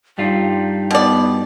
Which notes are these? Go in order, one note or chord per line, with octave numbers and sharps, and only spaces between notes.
G2 G3 D#4 F4
B2 B3 D5